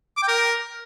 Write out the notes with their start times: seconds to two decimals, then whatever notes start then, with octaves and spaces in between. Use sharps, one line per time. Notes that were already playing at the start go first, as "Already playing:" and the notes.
0.17 D6
0.22 G5
0.28 A#4